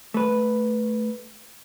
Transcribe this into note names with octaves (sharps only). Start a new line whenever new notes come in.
A3 B4